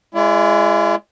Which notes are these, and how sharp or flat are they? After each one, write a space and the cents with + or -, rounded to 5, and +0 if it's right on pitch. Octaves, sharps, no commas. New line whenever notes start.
G#3 +0 E4 +40 D5 -40